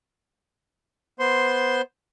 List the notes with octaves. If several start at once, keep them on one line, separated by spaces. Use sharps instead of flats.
B3 C5 C6